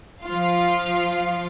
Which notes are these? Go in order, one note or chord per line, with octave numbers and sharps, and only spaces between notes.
F3 F4 F5